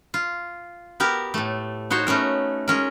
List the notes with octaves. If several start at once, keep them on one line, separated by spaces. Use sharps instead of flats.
F4
B3 G4 A#4
A2 A3
D#4 F#4 C5 C#5
A3 B3 C#4 A#4
G#3 C#4 A#4